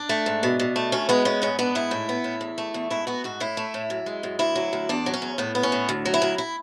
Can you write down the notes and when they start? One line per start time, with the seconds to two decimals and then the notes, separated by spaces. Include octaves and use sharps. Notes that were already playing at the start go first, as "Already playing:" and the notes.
Already playing: D4
0.09 A3
0.26 G#2
0.43 B2
0.60 B2
0.76 A3
0.92 D2 C#4
1.09 G#3 B3
1.25 B3 C#4
1.42 G#2 C#4
1.59 B3 D4
1.75 G#2 E4
1.91 A2
2.09 B3
2.24 A2
2.41 E2
2.58 A3
2.74 E2
2.90 G#2 E4
3.07 B3 F#4
3.24 G#2 F#4
3.40 A2 E4
3.57 A3
3.74 A2
3.90 F#2
4.06 G#3
4.23 F#2
4.39 D2 E4
4.55 F#3
4.73 D2
4.89 E2 D4
5.06 F#3
5.14 C#4
5.22 E2
5.38 A2 B3
5.55 B3
5.63 C#4
5.72 A2
5.89 D2
6.05 F#3
6.14 E4
6.22 D2
6.38 E4